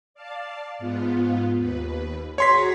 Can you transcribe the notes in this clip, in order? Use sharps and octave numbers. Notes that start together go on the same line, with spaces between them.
D5 F5 A5
G#2 B3 F4
D#2 B4
F#4 G#4 C#5 A#5 C6 B6